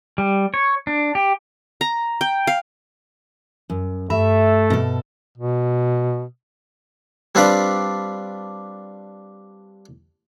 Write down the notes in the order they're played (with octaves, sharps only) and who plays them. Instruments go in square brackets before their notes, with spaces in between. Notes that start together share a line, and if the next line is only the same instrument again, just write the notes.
[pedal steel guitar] G3
C#5
D4
G4
[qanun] A#5
G5
F5
[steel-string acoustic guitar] F#2
[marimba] G2 [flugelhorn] A3 [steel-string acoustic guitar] E5
[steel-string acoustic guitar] B2 A4
[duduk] B2
[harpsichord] G3 C4 D4 F4 B4 D5